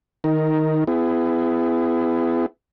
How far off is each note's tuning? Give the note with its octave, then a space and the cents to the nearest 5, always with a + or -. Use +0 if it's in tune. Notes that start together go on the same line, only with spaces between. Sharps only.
D#3 -5 D#4 +15 A#4 +0
B3 +35 E4 +25 G#4 +0